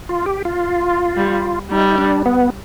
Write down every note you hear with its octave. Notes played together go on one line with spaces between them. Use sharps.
F4
G4
F4
G3
G3 D#4
D4
B3